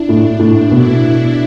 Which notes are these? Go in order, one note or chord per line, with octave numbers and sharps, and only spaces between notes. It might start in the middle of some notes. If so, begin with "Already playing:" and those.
Already playing: D4 E4
A2
A2
B2 E4